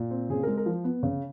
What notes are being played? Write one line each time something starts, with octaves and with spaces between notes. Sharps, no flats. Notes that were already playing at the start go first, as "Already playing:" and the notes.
Already playing: A#2
C4
C#3 G#4
G#3 A#4
A#4
F3
B3
C#3